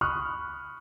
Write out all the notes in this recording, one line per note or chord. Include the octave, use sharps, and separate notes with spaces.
B5 C#6 D#6 F6 F#6